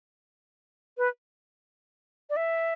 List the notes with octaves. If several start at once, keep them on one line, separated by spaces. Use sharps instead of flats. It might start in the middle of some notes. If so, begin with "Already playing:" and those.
B4
D5
E5